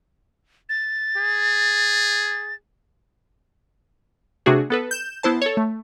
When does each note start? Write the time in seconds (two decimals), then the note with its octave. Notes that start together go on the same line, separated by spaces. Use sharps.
0.69 A6
1.17 G#4
4.46 C3 A3 D4 F#4 G#4
4.70 B3 A4 B4
4.91 G6 E7
5.23 B3 E4 C5 A5
5.42 A4 C#5
5.57 A3